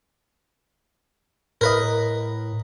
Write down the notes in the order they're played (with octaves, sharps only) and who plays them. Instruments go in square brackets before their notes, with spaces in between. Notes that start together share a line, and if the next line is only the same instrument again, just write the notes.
[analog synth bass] A2 [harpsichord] A#4 B4 D#5